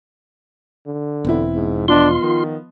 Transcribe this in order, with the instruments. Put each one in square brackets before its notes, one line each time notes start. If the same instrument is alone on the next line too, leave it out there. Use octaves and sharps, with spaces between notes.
[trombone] D3
[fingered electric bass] E1 [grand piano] B3 C4 E4
[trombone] G#2
[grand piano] F3 B3 D#5 [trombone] D4 [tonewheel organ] F4 C6
[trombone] D#3